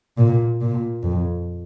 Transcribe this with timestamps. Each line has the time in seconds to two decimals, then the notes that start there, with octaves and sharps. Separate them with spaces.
0.17 A#2
0.61 A#2
1.03 F2